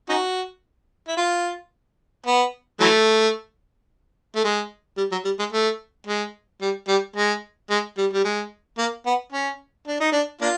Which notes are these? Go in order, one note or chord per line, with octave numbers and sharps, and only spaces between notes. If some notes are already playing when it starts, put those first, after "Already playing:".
C#4 D#4 F#4
E4
F4
B3
E3 F#3 A3
A3
G#3
G3
F#3
G3
G#3
A3
G#3
G3
G3
G#3
G#3
G3
G3
G#3
A#3
B3
C#4
D4
D#4
D4
A#3 D4 F4